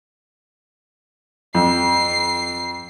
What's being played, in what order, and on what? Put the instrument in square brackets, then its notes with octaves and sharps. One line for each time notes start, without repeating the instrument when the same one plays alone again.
[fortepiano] F2 [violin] C7